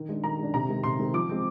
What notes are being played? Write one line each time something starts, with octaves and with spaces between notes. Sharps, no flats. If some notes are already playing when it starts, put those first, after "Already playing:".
Already playing: D#3
G#3 D4
D#3 A#5
G#3 D4
C3 A#5
D#3 G#3 C4
C3 C6
D#3 G#3 C4
F3 D6
G#3 C4